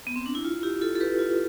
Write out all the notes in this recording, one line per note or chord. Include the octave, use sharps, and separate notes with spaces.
B3
C4
D4
E4
F4
E4 G4
F4 A4
A4
G4 B4
F4